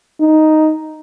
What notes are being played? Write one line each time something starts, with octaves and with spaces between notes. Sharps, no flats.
D#4